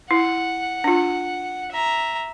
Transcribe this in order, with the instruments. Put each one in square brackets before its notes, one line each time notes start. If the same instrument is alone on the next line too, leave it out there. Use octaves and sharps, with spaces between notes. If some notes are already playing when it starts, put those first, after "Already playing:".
[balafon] E4 [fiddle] F#5
[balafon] D4 F4
[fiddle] E5 A#5